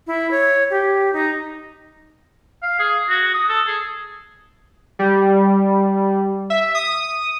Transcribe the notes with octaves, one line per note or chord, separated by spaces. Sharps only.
E4
C#5
G4
D#4
F5
G#4
F#4
D#6
A4
G#4
G3
E5
D#6